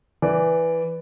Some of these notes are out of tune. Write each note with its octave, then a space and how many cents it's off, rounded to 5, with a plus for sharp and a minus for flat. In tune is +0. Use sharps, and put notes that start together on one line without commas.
E3 +0 D5 +0